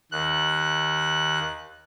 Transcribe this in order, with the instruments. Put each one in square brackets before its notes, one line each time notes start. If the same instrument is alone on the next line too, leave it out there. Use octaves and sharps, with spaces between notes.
[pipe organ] D#2 F#6